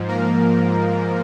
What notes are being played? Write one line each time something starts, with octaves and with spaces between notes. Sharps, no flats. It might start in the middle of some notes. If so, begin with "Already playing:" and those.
Already playing: G#2 F3
A#3 A#4